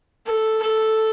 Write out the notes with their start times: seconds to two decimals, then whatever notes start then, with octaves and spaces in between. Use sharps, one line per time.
0.26 A4
0.62 A4